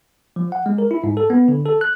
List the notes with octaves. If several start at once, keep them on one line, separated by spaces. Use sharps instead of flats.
F3
F#5
G#3
A#4
E4
G#2
A4
B3
D3
A4
F#6